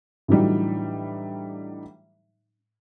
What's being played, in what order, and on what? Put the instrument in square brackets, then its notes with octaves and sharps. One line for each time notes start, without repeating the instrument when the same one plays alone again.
[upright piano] A2 D3 E3 F#3 G3 D#4